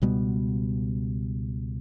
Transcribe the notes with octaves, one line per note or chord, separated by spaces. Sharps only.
C#2 B2 G3 B3